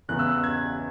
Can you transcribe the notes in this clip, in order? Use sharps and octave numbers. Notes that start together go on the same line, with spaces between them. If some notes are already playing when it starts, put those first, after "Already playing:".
E2 C#3 E3 B3 F#6
E6
F#6
G#6